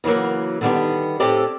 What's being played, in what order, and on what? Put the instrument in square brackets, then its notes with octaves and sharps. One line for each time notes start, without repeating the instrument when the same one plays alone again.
[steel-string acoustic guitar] C#3 E3 F#3 A#3
D3 D#3 G3 B3 D4
A2 C4 G4 A4 D5